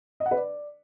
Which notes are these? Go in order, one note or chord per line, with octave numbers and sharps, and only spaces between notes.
D#5
F#5
B4
D5